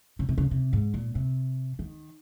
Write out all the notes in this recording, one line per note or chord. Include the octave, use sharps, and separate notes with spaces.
C#3
C3
C#3
C3
G#2
A#2
C3
D#3